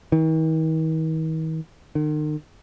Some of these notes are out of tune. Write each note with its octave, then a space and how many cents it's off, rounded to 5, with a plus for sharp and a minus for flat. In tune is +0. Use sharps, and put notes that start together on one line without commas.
D#3 +45
D#3 -40